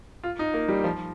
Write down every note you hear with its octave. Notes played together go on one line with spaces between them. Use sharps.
F4
D#4
A#3
G3
F3